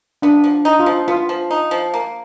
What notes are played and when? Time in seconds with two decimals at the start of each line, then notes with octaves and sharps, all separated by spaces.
0.22 B3 D4
0.44 F3
0.65 D#4
0.79 F4
0.86 F3
1.08 B3 F4
1.29 F3
1.51 D#4
1.71 F3
1.94 A#3